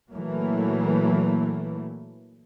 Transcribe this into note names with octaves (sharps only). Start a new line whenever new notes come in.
A#2 E3 F#3 A3 A#3